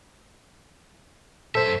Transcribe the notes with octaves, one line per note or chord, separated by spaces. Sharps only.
F#2 A4 C5 E5